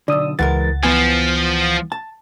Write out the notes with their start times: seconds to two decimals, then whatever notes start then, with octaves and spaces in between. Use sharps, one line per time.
0.08 B1 D3 D5 D#6 E6
0.39 C#2 E3 G#3 A#4 F#5 A6
0.83 E3 F3 B3 G#5
1.92 A5